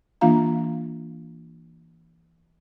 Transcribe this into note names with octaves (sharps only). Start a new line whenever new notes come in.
E3 A#3 D4 F4 F5 A#5